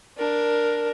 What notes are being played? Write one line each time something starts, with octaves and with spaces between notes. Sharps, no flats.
D4 A#4